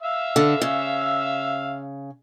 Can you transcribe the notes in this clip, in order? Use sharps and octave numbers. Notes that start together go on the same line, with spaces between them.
E5 F5 E6
D3
C#3